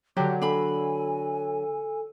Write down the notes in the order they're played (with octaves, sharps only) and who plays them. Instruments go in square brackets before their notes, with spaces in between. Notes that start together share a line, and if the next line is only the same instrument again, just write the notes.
[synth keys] D3 F#3 [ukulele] G4 [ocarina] D6
[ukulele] D4 B5 [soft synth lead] A4 [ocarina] G#5